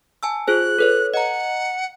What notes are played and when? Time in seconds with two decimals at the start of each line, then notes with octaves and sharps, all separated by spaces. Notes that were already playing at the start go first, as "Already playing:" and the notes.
0.23 G#5 A5 E6
0.48 F4 G#4 C5 F#6
0.79 A4 B4 C#5
1.14 D#5 F#5 A#5